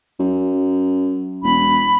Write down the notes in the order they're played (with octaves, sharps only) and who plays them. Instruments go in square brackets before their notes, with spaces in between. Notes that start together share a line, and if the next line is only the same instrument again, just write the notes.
[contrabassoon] F#2
[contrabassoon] E1 [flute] B5